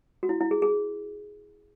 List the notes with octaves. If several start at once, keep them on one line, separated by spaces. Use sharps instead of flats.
F#4
E4
E4
G#4
G#4